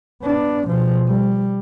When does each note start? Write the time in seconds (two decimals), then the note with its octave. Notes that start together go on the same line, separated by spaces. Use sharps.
0.23 B3 D4
0.67 B2 F3
1.07 G3